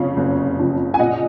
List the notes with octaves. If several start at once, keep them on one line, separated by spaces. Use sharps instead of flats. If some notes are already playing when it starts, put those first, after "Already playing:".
Already playing: F#1 F2 C#3 F3 C#5 F5
F#1
F2 C#3 F3
G#5
A#1 D#5 F#5